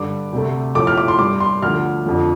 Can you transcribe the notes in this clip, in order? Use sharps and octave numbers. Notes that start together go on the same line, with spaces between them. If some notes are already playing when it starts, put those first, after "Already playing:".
Already playing: G2 D3 G3 D6
D2 C3 A3
A2 F3 A3 D6
F6
D6
C6
G2 G3 D6
C6
D2 D3 F3 F6
F2 D3 F3